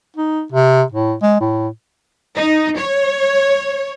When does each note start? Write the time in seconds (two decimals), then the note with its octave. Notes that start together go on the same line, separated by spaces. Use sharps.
0.17 D#4
0.52 C3
0.92 A2
1.22 G#3
1.41 A2
2.36 D#4
2.77 C#5